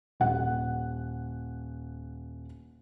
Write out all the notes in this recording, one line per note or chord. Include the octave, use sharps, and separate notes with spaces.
D#1 F#5